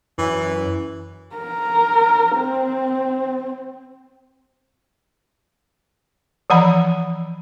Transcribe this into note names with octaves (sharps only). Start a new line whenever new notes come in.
F#2 E3
A#4
C4
E3 F3 F#5 A#5 B5